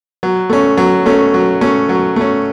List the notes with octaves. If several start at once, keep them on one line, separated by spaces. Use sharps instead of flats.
F#3
A3 C#4
F#3
A3 C#4
F#3
A3 C#4
F#3
A3 C#4